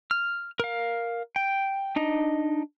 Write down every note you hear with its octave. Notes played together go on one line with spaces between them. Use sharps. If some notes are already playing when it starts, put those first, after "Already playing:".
F6
A#4 F5
G5
D4 D#4 D#5